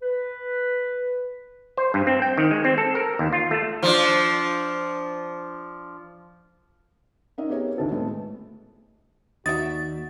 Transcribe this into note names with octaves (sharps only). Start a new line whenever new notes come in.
B4
C5
G2
C4
G5
D#3
G#3
C4
A4
A#4
D#2
F4
A3
F3 D4
C#4 D#4 A#4 D#5 E5
B3 G4 G#4 A#4 C#5
D2 D#3 A4
A2 G#3 A3 B3
D#2 D#4 F#4 D5 E5 A6